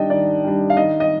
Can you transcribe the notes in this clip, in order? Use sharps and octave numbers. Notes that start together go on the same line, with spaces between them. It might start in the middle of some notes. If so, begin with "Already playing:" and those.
Already playing: D#3 G3 D4 D#5 G5 A5
D#3 D5
G3 D4
F5
D#3 D#5
D#5